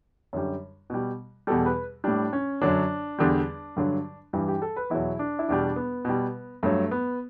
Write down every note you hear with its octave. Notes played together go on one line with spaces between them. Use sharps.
F#2 D3 G3
B2 G3
E2 B2 G3 A4
B4
A2 G3 D4
C#4
F#2 D3 F#3 D4
E2 D3 G3
G2 D3 F#3
G2 E3 G3
G4
A4
B4
E2 B2 F#3 E4
D4
E4
E2 B2 G3 D4
B3
B2 G3
G2 F#3 A3
B3